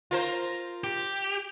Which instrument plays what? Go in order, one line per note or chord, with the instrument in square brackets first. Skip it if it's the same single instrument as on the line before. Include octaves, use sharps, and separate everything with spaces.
[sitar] F4 A#4 C5
[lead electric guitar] G4